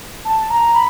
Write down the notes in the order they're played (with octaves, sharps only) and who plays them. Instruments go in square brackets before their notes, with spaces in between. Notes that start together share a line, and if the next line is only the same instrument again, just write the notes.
[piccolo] A5
A#5
B5